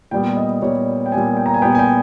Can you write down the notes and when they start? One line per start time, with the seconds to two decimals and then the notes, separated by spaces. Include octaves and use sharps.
0.11 A#2 G3 B3 G5
0.37 D#5
0.62 A#2 G3 B3 C#5
1.06 G5
1.12 A#2 G3 B3 G#5
1.37 G5
1.46 A#5
1.54 G#5
1.62 A#2 G3 B3 G5
1.75 G#5
1.79 G5